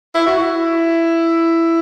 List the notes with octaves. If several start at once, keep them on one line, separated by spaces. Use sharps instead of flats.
E4
F#4
E4